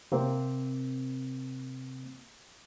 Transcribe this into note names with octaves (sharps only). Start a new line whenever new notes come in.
C3 A#3 C4